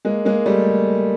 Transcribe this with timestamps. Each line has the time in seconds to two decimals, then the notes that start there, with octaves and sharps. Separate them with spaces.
0.05 G#3 A#3
0.25 G#3 A#3
0.46 G3 A3